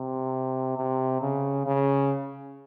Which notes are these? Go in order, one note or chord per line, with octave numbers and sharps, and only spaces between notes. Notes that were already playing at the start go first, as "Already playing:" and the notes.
Already playing: C3
C3
C#3
C#3